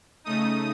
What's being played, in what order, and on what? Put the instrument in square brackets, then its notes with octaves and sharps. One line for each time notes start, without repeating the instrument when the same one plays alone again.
[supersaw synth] C#3 A3 D#4 D#6